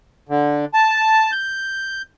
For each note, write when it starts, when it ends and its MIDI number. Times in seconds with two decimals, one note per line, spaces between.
0.29 0.65 50
0.74 1.32 81
1.32 2.02 91